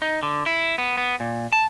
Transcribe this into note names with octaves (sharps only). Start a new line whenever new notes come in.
D#4
D3
E4
B3
B3
A#2
A5